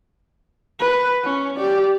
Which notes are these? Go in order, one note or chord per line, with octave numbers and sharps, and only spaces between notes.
B4
C#4
G4 D5